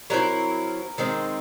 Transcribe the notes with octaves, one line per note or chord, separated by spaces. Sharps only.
F#3 A3 C4 E4 A#4
D#3 G#3 C4